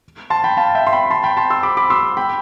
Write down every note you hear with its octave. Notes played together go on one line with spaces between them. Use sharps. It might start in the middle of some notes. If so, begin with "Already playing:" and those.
A5 C6
G5 B5
F5 A5
E5 G5
C6
G5 B5
A5 C6
G5 B5
A5 C6
C6 E6
B5 D6
B5 D6
C6 E6
G5 B5